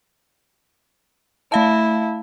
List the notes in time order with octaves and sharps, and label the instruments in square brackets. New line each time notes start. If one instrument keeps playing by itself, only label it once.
[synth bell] A3 F5 A5 [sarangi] E4